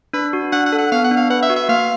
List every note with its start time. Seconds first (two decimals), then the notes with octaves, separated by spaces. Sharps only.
0.13 D4 B4
0.33 F#4
0.52 D4 F#5
0.66 F#5
0.73 A4
0.78 F#5
0.92 B3 F5
1.04 F#5
1.11 D4
1.17 F5
1.30 B4 F#5
1.43 E5
1.50 F#4
1.56 E5
1.69 A#3 F5